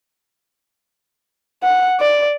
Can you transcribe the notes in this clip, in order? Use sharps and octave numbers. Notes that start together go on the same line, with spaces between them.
F#5
D5